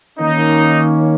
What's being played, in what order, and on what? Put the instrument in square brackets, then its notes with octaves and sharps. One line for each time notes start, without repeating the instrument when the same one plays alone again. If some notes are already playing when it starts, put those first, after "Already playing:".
[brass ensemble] D#3 A#3 C#4 D#4